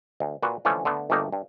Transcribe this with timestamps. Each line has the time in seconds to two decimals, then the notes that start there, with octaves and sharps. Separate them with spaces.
0.20 D2
0.43 A#2 F#4 B4
0.65 D3 E3 F3 A3 C#4
0.85 D3 A3 B3
1.10 G1 D2 A3 A#3 G4 D#5
1.32 G2